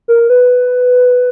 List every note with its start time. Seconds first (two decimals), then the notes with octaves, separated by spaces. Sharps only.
0.08 A#4
0.30 B4